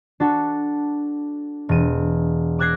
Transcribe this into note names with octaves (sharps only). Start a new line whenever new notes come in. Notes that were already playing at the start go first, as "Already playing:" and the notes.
D4 F#4 A4
E1 D#7
D6 E6 F#6 G#6 A#6 C7